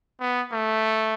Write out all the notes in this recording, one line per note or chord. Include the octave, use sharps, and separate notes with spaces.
B3
A3